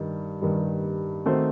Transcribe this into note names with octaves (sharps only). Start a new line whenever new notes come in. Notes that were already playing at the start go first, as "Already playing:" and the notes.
Already playing: G2 D#3 G3
G2 D#3 G3
D#3 A3 C4 F#4 C5